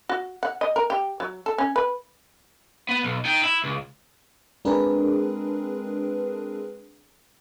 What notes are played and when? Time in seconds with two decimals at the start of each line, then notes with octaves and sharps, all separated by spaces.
0.09 F#4
0.43 F#5
0.61 D#5
0.76 A#4
0.90 G4
1.20 F#3
1.46 A4
1.58 C#4
1.76 B4
2.89 B3
3.03 B1
3.25 D#4 G5
3.43 E4
3.64 C#2
4.65 G#3 C4 D4 G#4 A#4 B4